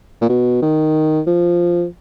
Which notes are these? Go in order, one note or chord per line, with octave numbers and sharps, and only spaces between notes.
A#2
B2
D#3
F3